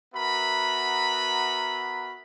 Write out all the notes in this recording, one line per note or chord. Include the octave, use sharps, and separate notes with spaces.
B3 F#4 A#4 E5 A#5 B5